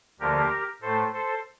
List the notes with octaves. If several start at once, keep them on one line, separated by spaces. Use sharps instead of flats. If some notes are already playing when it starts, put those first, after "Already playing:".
D2 D3 F3 A#3 G4 A#4
A2 A3 A4 C5
A4 C5